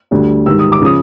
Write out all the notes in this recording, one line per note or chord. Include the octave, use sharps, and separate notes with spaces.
D2 D3 G3
G#2 D#3 G3 E6
D#6
D6
C#3 F3 D#6